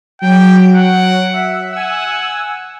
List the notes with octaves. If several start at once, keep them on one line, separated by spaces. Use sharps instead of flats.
F#3 G5 D7
F#5
E5
F#5 G#5 E6